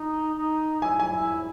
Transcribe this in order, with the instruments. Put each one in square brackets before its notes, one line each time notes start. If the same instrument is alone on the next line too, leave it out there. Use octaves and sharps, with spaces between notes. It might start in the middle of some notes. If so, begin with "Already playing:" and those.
Already playing: [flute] D#4
D#4
[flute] E4 [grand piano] G#5
[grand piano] G#5
[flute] E4